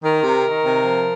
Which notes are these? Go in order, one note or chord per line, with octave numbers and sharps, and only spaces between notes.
D#3 A#4
C3
D#3
C3
F3